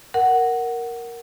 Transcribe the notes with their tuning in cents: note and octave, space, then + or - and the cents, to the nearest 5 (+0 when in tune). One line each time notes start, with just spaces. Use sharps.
A#4 +0 F#5 +5